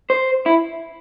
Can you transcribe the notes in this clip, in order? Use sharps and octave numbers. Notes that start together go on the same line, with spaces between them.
C5
E4